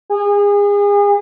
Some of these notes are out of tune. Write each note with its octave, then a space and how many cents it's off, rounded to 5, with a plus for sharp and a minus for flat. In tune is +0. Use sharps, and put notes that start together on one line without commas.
G#4 -35